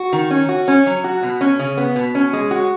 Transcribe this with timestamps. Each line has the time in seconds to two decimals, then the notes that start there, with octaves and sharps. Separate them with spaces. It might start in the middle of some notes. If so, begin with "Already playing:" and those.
Already playing: F#4
0.13 D#3
0.30 C#4
0.49 F#4
0.68 C#4
0.86 F#3
1.04 F#4
1.23 B2
1.41 C#4
1.59 C#3
1.78 B3
1.96 B2
2.15 C#4
2.33 G#3
2.51 F#4